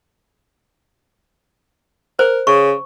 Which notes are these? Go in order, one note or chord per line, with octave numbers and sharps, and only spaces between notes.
A#4 C5
C#3 C#6